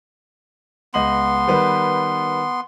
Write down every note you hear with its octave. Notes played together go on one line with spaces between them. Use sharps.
C#2 B3 D#5 C6 F#7
D#3 G3 B4